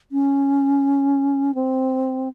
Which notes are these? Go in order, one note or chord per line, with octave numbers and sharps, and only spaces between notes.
C#4
C4